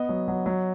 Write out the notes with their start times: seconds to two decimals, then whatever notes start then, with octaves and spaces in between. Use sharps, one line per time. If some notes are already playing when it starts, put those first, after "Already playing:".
Already playing: B3 D#5
0.09 F#3
0.28 F#3
0.46 F#3